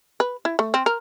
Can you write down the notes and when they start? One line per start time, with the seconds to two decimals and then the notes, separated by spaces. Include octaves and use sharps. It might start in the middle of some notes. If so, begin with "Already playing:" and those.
0.20 B4
0.45 E4
0.59 A3
0.74 C4
0.86 A#4